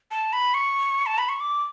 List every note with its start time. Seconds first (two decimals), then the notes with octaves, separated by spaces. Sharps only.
0.11 A5
0.33 B5
0.54 C#6
1.06 A5
1.18 B5
1.29 C#6
1.40 D6